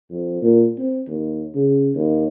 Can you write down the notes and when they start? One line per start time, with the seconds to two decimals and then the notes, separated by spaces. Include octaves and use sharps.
0.11 F2
0.42 A#2
0.79 C4
1.08 D#2
1.55 C#3
1.95 D#2